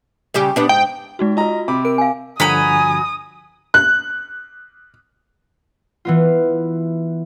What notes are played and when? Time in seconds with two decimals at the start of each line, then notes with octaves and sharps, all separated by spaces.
0.34 C#3 G3 G4
0.56 B3 D4 G4
0.69 G#2 G5
1.19 G#3 D#4 F#4
1.37 F4 F#4 D#5 A#5
1.68 C3 B5 D6
1.85 A#4 D7
1.98 F5 G#5
2.40 G2 D3 F3 F#4 G#5 A#5 B5 D#6
3.74 F#6
6.05 E3 B3 F4